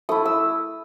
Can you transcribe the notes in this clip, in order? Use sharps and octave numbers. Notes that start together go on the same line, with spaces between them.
A3 E4 D#6
E6